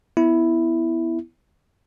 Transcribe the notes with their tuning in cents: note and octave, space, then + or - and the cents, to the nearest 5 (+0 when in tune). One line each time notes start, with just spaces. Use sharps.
B3 +10 E4 +0